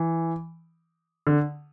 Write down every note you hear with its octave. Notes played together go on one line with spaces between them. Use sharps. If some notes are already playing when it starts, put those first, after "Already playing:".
Already playing: E3
D3